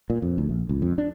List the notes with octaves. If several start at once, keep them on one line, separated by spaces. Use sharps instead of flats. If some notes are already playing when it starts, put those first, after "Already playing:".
A#2
F2
D2
A#1
C#2
F2
D4